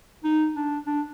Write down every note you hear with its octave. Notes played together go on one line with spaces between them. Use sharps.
D#4
D4
D4